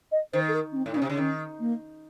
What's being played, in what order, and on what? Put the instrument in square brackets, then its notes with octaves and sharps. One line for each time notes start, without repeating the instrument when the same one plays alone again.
[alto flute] D#5
[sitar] D#3 [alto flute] C5
[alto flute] A4
A#4
C#4
C4
[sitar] A2
[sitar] A#2 [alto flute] D#4
[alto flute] C#4
[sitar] C3
C#3
[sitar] D#3 [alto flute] C#4
[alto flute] A#3